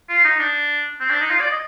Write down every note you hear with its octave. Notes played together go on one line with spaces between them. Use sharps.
F4
D#4
D4
C4
D4
D#4
F4
D5
D#5